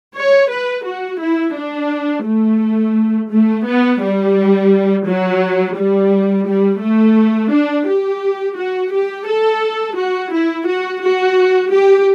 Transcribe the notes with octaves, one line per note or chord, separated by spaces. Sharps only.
C#5
B4
F#4
E4
D4
A3
A3
B3
G3
F#3
G3
G3
A3
D4
G4
F#4
G4
A4
F#4
E4
F#4
F#4
G4